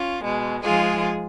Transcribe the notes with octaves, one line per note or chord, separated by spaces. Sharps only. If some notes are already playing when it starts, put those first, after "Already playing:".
Already playing: C#4 F4
B2 G#3
G#2 F3 G#3 F4 G#4